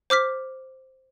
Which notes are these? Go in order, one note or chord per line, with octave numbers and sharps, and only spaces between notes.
C5 D6 F6 B6